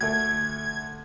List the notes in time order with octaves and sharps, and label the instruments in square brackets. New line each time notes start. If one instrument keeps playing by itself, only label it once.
[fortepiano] D2 A3 [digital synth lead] G#6